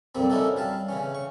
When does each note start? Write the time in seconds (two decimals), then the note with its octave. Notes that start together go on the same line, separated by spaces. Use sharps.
0.15 F2 A#2 G3 A#3 C4
0.29 C#4 D#4 E4 F#4 A4 D5
0.56 G3 F5 A5
0.89 C#3 E3 C#4
1.15 C#6